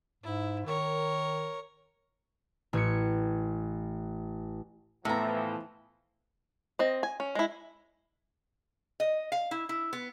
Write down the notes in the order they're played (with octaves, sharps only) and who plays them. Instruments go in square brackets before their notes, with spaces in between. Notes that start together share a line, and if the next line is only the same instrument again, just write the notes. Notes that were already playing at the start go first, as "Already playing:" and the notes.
[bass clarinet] G#2 [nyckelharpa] E4
[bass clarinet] D#3 [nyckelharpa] A#4 C#5
[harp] A1 G#6 C#7
[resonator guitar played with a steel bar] A2 [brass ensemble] E3 F3 [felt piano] A3 B3 [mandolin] E5 A#5
[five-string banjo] C4 D#5
G#5
C#4
G#3 E4
[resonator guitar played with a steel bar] D#5
F5
E4
E4
B3